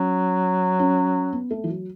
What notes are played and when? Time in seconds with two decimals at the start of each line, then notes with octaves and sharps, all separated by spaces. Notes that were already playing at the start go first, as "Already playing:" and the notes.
Already playing: F#3 C#4
0.79 C#4
1.33 B3
1.51 A3
1.64 E3
1.69 F#3